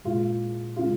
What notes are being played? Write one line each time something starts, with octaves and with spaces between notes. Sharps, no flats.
A#2 G#3 F4
C#3 G#3 F4